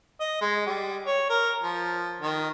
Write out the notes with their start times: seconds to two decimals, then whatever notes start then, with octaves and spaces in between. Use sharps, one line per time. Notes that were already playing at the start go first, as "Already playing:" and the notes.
0.20 D#5
0.41 G#3
0.66 G3
1.06 C#5
1.30 A#4
1.63 F3
2.21 D#3